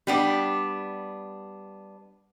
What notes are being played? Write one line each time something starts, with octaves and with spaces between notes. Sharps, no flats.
G3 B3 D4